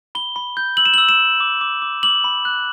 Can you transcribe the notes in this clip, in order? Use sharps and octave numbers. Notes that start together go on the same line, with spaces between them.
B5 G7
B5
G6
E6 F#7
E7
E6 F#7
E7
E6
D6
D6
D6
D6 F#7
B5
F#6